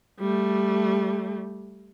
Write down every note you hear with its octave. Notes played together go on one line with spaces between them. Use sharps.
G3 A3